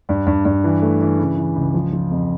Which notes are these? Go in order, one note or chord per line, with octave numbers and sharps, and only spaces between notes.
G2
G2
G2
E3
A3
E3
C#3
E3
C#2
F3
F3
F2